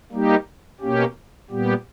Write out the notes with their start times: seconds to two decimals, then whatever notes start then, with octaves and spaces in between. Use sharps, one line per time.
0.12 G3 A#3 D#4 G4
0.81 B2 A#3 C#4 G4
1.50 A#2 G3 B3 G4